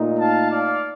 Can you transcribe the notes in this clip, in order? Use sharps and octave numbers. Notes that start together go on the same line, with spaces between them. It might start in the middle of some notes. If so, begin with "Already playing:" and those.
Already playing: A#2 A3 D#4
F5 A5
D5 F5